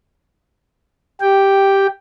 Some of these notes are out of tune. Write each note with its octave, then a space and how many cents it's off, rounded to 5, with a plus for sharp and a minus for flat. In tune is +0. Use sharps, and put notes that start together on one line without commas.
G4 +0 G5 +0